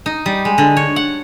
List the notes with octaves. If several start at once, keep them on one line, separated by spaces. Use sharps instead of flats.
D#4
G3
G#3
D3
C#5
F#5